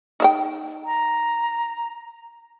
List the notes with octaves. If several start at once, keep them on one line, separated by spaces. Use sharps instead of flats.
D#4 E5 G5
A#5